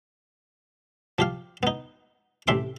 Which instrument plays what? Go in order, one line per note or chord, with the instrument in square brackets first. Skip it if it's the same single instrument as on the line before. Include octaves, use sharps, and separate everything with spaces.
[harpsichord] F3 G4 F5
B3 D#4
A1 C3 E5 C6 D6